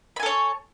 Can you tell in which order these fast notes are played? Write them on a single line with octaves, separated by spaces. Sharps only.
B5 G#5 A4 C#5